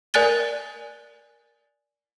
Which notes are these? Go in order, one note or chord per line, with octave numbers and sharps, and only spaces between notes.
A#4 D5 G#5 F#6 A6 G7